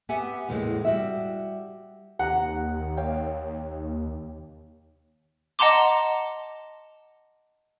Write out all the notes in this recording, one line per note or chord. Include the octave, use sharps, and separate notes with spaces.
B3 G4 E5 F#5 G#5
E2 A2 C#3 F#3 G#3 A#3
G3 F#4 E5
D#2 G4 F#5 A#5
C#5 F5 G5
D#5 F#5 A5 A#5 C6 D6